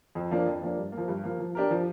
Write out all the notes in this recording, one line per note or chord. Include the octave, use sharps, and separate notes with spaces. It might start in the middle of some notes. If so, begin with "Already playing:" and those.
F2
F3 A#3 D4
F2
F3 A#3 D4
G2
A#3
F3
G2
F3 A#3
F3
D4 G4 A#4
F3